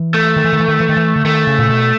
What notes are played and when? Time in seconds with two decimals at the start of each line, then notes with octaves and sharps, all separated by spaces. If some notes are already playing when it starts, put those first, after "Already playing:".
Already playing: E3
0.14 A3
0.36 D#3
0.44 E3
0.53 D#3
0.60 E3
0.68 D#3
0.80 E3
0.89 D#3
0.97 E3
1.16 D3
1.25 D#3 A3
1.47 C#3
1.59 A#2
1.69 B2